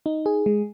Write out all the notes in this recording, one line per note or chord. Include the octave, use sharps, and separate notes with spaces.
D#4
G#4
G#3